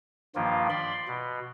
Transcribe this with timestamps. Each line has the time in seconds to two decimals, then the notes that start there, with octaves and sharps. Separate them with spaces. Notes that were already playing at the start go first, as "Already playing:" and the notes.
0.35 G2 D#3 F3 A#3 F4
0.70 D5 B5 C6
1.08 B2